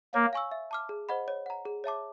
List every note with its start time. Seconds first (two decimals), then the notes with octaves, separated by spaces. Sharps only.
0.14 A#3 C#5
0.33 F5 G#5 C#6 E6
0.51 E5
0.71 A5 D6 F6
0.89 G#4
1.09 C5 D#5 F#5 B5
1.28 C#5
1.46 F#5 A#5
1.65 G#4
1.84 C#5 E5 A5 D6